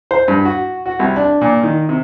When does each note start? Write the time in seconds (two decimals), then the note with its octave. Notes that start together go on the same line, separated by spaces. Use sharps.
0.11 C5
0.28 G2
0.45 F#4
0.86 F#4
0.99 C2
1.16 D4
1.41 A#2
1.63 D#3
1.89 C3